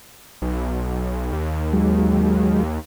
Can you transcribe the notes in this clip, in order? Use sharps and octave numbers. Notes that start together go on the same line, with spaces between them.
B1
D#2
F#3 G#3